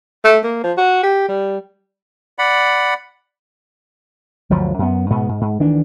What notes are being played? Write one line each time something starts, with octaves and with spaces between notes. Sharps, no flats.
A3
A#3
F3
F#4
G4
G3
D5 F#5 B5
G1 D2 F3 F#3
F#2 B3
G#2 B2 B3
G#2
G#2
D2 D#3 E3 D4